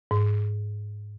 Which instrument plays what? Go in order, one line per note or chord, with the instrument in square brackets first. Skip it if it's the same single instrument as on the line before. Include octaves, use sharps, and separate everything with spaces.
[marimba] G#2